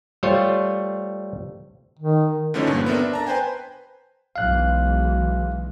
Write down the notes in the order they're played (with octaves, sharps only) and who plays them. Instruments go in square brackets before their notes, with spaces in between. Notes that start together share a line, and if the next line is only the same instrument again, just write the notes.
[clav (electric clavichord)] G3 A3 F4 C5 C#5
[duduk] D#3
[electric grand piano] D3 E3 F3 A3 C#4 D#4
G2 A#2 A#3
B3 C4 D4 A4 A#4 E5
D4
A5 A#5
B4 C5 G5 G#5
[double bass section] B1 E3 G#3 [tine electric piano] F5 F#6